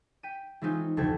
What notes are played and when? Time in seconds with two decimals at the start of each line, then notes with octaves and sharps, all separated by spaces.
0.23 G5 B6 D#7
0.62 E3 G#3 C4 C#4 D#4 F4
0.97 F1 D2 C3 A4 G5 G#6